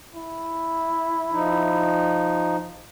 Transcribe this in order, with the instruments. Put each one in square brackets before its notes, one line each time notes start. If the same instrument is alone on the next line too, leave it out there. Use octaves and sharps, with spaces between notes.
[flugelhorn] E4
[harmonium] F3 D#4